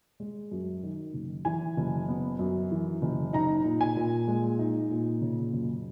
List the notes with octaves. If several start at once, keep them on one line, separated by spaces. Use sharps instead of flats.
G#3
F#2
D#3
F#1
E3 G#5
F#1
B3
F#2
E3
F#1
D#4 A#5
A#2
G#5
A#2
G#3
D#4
A#2
C#3
F#1